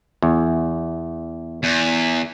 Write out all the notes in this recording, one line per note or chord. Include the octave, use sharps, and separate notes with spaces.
E2
E2